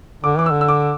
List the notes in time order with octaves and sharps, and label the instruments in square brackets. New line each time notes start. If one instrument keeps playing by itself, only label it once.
[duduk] D3 [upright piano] D6
[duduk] E3 [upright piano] D6
[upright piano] E6
[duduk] D3
[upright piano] E6
D6